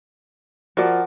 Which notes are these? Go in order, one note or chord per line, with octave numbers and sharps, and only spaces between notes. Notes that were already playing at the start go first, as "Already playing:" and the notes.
F3 F#4 A#4 D5